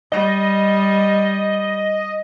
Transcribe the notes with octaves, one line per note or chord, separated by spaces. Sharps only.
G3 D#5